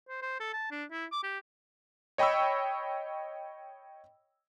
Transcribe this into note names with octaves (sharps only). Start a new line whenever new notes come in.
C5
C5
A4
A5
D4
E4
D6
G4
C#5 D#5 G5 B5 C#6 E6